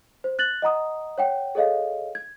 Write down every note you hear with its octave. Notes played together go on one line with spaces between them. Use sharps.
C5
F#6 A6 F#7
D#5 F#5 A#5 D#6
C#5 F#5 G5
G#4 A4 C#5 D#5 F5
G#6